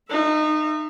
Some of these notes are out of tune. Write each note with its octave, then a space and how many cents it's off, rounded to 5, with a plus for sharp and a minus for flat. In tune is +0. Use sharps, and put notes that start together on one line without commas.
D#4 -25 E5 +10